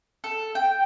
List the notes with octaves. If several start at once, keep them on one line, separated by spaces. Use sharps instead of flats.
A4
G5